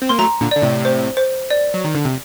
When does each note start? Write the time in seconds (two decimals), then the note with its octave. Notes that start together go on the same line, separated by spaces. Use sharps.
0.02 C4
0.09 A#3 C6
0.18 F#3 A3 A#5
0.41 A#2 D3
0.51 D3 D5
0.62 A2 C3
0.85 C5
1.17 C5
1.50 D5
1.74 F#3
1.85 D#3
1.95 D3
2.05 C3